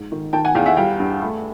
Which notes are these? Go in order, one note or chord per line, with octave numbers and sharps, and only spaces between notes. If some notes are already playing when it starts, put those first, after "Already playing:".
Already playing: G#2
D#3
D#3 G5 A5
F#5 G#5
E2 F5 G5
E5 F#5
G3 F5 G5
G2
A3